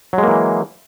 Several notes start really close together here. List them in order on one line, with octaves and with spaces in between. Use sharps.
F#3 G#3 A#3 E3